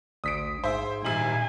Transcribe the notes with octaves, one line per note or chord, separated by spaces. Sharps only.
A1 D2 D#6 B6 D7
G#2 C5 E5 G#5
G#1 A#2 G3 D#4 E5 G#5 F#7